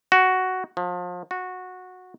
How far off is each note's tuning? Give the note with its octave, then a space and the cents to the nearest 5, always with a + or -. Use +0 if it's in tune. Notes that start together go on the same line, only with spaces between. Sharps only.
F#4 +5
F3 +35
F#4 -15